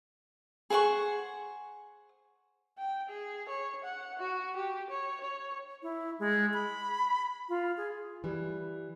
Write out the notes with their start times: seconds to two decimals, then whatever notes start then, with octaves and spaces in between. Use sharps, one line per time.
0.70 G#4 C5 F#5 C#6
2.78 G5
3.09 G#4
3.49 C#5
3.84 F#5
4.19 F#4
4.56 G4
4.90 C#5
5.20 C#5
5.83 E4
6.19 G#3
6.53 B5
7.49 F4
7.77 G#4
8.24 E3 G3